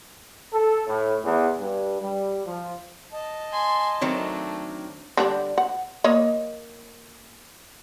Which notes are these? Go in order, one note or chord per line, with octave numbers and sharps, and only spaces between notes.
A4
A2
E2
G2
G3
F3
D#5 A5
G#5 C6
D#3 F#3 A3 C4 D4
D3 G3 D4
F#5
A#3 C#5 D#5